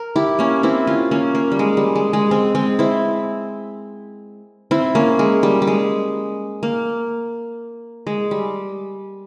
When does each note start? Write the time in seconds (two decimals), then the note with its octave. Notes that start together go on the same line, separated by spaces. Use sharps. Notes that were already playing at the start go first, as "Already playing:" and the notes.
Already playing: A#4
0.16 E4 G4
0.39 A#3 C#4
0.63 C4 E4
0.87 C#4 F4
1.11 A#3 C#4
1.35 A#3
1.52 G3
1.59 G#3
1.77 G3
1.96 G#3
2.13 G#3
2.31 G#3 C4
2.55 G#3 C4
2.79 C4 E4
4.71 C4 E4
4.95 A#3 C#4
5.19 G#3
5.43 G3
5.62 G3
5.67 G#3
6.63 A#3
8.07 G#3
8.31 G3